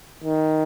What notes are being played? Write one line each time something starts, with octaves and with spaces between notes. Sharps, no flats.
D#3